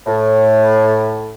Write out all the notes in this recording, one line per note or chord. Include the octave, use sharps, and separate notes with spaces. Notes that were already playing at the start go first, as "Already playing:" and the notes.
A2